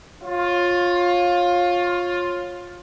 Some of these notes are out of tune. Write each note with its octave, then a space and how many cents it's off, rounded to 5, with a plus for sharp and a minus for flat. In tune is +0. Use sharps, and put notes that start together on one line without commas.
F4 +15 C#5 -20